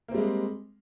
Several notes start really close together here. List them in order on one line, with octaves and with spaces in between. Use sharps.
A#3 C4 G3 G#3